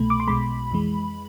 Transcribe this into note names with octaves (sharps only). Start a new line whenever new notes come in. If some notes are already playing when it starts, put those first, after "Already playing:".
Already playing: C2 B2 A3 B5
D6
C6
B1 B2 G#3 B5
F2 E3 G#3